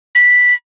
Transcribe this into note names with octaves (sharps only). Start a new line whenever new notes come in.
B6